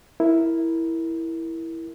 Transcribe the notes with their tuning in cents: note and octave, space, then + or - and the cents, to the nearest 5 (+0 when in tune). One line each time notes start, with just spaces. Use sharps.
E4 +0 A#4 +0